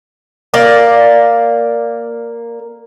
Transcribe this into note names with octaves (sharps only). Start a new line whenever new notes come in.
A#3 D5